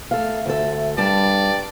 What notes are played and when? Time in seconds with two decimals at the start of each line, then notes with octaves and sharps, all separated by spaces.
0.11 A3 A4 F5
0.46 D2 A4
0.98 G2 G3 D4 A#4 D5 A5